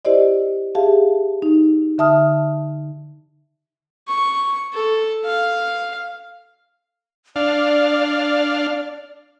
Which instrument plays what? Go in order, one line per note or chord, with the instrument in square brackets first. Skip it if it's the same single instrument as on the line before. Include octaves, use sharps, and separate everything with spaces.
[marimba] E4 G4 C5 D5 D#5
G4 G#4 E5 F5 A5
D#4
D3 E5 A5 D#6 F6
[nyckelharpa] C#6
A4
F5
[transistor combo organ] D4 F5 [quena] D5